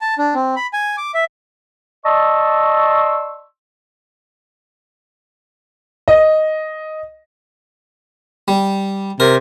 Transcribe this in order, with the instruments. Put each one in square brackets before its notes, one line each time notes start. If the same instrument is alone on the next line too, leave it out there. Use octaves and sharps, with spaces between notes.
[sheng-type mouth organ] A5
D4
C4
B5
G#5
D6
E5
[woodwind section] D5 D#5 A5 C6 C#6 E6
[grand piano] D#5
[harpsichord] G3
[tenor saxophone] C3 [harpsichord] A#4